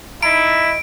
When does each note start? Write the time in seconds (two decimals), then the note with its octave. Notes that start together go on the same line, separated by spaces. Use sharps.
0.23 E4 D#5 A#5 D7